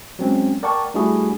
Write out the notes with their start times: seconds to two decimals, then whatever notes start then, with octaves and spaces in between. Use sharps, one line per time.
0.19 F#3 G#3 C4 C#4
0.63 A#4 D5 F#5 G5 A5 C#6
0.94 G3 A3 D4 E4 F#4 G#4